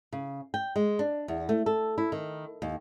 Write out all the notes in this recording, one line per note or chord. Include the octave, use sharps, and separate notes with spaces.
C#3
G5
G#3
D4
E2
A3
A4
E4
D#3
D#2